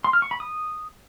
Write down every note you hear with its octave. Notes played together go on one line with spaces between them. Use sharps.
C6
F6
C#6
B5
D#6